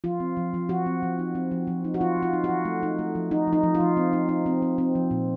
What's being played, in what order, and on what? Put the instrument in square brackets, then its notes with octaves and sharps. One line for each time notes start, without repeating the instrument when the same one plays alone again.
[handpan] F3 F4
C4
F3
F3
F3 F#4
C4
F3
D#4
C4
F3
F3
D#4
F#4
F3 F4
F3
F4
D#4
F#4
F3
A3
D#4
A3
F3
D#4
F3
D#4
F3
F4
F3
C4
D#4
D#4
C4
C4
C4
F3
A#2